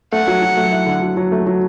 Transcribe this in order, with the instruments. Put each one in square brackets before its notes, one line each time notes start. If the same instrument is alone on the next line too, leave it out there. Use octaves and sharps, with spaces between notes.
[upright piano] A3 [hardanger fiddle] F#5
[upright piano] F#3
F#3
A3
E4
D3
F#3
F#3
A3
F#3